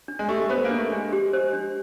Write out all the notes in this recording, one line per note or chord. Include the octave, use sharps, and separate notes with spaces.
D4
G#3
A3 G4
A3
B3 C5
A#3
D4
A3
G#3 D4
G4
C5
D4